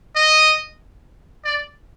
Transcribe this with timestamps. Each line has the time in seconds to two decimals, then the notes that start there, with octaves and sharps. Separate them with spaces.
0.16 D#5
1.44 D5